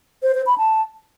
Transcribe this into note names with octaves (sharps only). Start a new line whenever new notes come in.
C5
C5
B5
A5